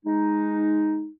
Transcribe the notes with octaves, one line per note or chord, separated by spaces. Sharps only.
G#3 D#4